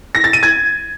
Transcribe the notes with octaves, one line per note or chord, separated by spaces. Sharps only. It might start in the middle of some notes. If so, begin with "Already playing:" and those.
A#6
A6
D#7
G#6